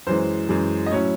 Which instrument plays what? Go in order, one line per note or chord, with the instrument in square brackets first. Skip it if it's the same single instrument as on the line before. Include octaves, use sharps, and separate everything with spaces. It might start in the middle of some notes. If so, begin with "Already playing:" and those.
[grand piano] F#2 E3 G#3 C5
F#2 E3 G#3
D#5
A2 F#3 C#4 E4 C#5